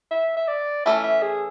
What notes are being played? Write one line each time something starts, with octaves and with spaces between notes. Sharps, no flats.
E5
E5
D5
E3 A3 C#4 E5
E5
G#4